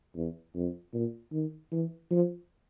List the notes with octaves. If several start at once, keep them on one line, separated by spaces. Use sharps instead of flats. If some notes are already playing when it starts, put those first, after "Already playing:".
E2
F2
A#2
D#3
E3
F3